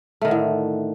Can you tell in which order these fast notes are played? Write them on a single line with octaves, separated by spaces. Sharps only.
A3 D#3 D3 A2